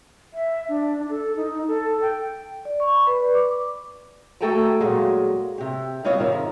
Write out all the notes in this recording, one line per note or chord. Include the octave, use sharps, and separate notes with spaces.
E5
D4
A4
D#4
A4
G5
D5
C#6
B5
B4
D5
D6
A3 F#4 A4 G5 G#5 A#5
A#2 F#3 G#3
C3 G4
G3 B3 C4 F4 C#5 D#5
F2 G#2 C3 D#3 F3